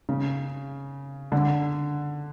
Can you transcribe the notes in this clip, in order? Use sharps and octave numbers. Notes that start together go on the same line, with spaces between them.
C#3
D3